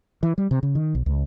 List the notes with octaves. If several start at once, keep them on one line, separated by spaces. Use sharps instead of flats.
E3
G3
C3
C#3
D#3
B1
C#2